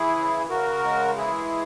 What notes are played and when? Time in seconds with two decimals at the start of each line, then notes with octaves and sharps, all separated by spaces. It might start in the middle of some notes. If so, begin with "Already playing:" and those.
Already playing: E3 E4 G#4
0.16 C#3
0.49 C#3 F#4 A#4
0.84 G#3
1.17 E3 E4 G#4